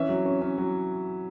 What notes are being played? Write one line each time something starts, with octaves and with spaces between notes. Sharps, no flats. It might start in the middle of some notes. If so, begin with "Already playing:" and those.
Already playing: E3 C#4 E5
F#3
C#4
C#4
F#3